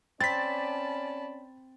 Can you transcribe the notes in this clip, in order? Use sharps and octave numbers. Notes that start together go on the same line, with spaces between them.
C4 C#4 D5 A5 B5 A6 B6